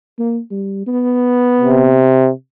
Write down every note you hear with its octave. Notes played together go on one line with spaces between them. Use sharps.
A#3
G3
B3
C3